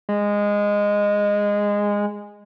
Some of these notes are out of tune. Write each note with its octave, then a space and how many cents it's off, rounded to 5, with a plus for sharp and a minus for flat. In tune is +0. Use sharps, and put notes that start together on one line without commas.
G#3 -15